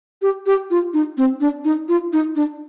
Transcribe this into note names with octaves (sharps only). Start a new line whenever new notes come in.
G4
G4
F4
D#4
C4
D4
D#4
F4
D#4
D4